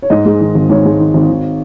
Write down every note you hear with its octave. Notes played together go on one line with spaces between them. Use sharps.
C#5
G#2 D#5
G#3
D#3
G#1
G#2 C#5
G#3
D#3
G#1
D#3